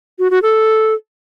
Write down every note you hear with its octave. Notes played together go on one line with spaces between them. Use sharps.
F#4
F#4
A4